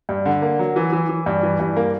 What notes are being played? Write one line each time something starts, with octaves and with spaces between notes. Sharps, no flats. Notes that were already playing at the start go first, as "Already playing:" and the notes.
G2
D3
A#3
F#3
E3
E3
E3
G2
E3
G2
A#3